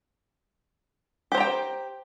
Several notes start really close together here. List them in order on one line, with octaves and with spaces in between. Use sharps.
G4 C5 A#5 G5